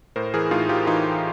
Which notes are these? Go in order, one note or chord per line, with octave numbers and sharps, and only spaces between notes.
A2 A#4 C5
E3 G#4 A#4
A2 D#4 F4
E3 F4 G4
E3 D#4 F4
E3